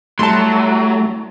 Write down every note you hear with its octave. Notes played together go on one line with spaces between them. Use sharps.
F#3 G3 A3 E4 A5 C6